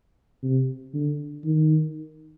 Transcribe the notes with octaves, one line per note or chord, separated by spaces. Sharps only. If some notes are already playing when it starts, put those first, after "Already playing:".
C3
D3
D#3